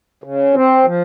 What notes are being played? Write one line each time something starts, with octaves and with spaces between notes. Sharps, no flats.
C#3
C4
F3